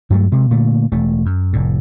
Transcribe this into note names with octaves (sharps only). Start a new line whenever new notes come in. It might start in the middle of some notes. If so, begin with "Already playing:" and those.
G2 F#3 G3 A3
C3 G#3
A#2 D3 A3
E1 A3
F#2
F1 A2